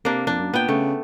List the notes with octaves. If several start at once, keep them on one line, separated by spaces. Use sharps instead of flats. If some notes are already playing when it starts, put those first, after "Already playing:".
C3 A#3 D4
F2 D4
F#2
A#2 B3 G5
C#3 A3